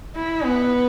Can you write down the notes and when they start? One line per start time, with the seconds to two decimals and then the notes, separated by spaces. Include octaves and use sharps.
0.16 E4
0.45 B3